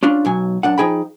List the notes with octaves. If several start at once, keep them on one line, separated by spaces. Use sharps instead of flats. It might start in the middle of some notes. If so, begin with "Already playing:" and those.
C#4 D4 F4
B1 F#3 G#5
F#2 D4 F#5
F3 D#4 G#4 G5 B5